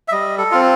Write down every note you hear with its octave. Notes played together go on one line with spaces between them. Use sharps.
E5
G3 D#5
A4
C4 F4